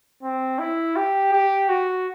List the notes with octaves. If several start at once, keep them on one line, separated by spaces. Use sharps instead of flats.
C4
E4
G4
G4
F#4